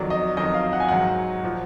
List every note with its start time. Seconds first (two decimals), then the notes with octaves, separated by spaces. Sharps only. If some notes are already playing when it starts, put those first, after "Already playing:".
Already playing: F2 D#3 F#3 D5
0.10 D#5
0.37 F2 D#3 F#3 D#5
0.54 F5
0.73 F#5
0.80 G#5
0.88 G#2 D#3 F#3 F#5
1.44 A#2 F3